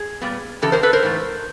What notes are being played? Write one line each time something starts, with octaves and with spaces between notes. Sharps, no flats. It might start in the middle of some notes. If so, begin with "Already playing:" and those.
Already playing: G#4
A#2 G3 B3
C#3 E3 G4 A4
A#4 C5
A4 B4
A#4 C5
G#2 E3 A3